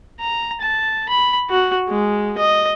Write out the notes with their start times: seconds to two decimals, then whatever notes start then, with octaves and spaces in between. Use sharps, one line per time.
0.20 A#5
0.61 A5
1.09 B5
1.50 F#4
1.89 G#3
2.38 D#5